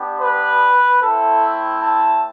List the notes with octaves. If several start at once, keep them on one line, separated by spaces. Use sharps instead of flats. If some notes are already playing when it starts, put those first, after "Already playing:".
Already playing: B3 D4 G4
B4
A3 C4 E4 A4
A5